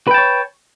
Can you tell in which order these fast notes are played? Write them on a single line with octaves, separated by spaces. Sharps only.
B4 G5 A5 C#5